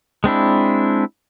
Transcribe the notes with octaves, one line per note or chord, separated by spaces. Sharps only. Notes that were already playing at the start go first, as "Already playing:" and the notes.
G#3 C4 D4 E4